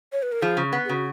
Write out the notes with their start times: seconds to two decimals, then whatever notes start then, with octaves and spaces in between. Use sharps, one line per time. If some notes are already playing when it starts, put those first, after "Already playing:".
0.13 C#5
0.22 B4
0.32 A#4
0.42 F3 G#4
0.57 C#3
0.73 B3
0.85 G#4
0.89 C#3 F#4